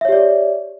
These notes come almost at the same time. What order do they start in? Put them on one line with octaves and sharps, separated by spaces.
E5 C#5 G4 D5